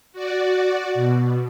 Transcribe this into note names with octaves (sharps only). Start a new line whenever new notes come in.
F#4 D5
B2